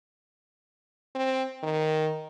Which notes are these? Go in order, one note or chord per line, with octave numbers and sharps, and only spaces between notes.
C4
D#3